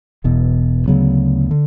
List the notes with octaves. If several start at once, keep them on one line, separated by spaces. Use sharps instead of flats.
E1 E2 B2
D2 C#3 F#3 B3
D3